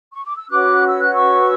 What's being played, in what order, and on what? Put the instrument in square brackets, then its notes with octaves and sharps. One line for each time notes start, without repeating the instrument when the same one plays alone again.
[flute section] C#6
D6
E6
C#4 F#4 B4 D6 F#6
E6
F#6
C#6 E6